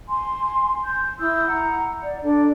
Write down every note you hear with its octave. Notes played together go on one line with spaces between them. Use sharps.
G#5 C6
G6
E4 D#6 E6 G6
F#5 A#5
D5
D4 A4